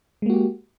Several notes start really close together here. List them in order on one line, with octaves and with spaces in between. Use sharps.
G#3 A#3 F#4 G4